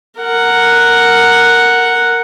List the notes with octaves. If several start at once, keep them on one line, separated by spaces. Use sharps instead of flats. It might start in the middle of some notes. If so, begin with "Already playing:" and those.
A#4 F#5